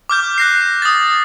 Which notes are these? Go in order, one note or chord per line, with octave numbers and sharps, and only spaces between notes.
D6 F6 G6
F#6 A#6 C7
D#6 A6